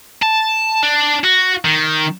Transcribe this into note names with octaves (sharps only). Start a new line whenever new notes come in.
A5
D4
F#4
D#3